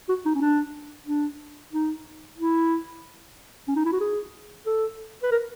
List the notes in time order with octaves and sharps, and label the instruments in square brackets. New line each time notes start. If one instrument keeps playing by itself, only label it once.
[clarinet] F#4
D#4
C#4
D4
D4
D#4
E4
C#4
D#4
E4
F#4
G#4
A4
B4
A#4